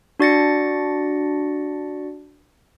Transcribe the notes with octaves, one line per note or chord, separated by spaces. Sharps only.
D4 F#4 D5 A6 A#6 C#7